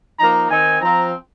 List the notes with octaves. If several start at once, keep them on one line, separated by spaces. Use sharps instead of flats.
F3 A#3 D#4 A#5
D#3 C4 D#4 G#5
F3 C4 F4 A#5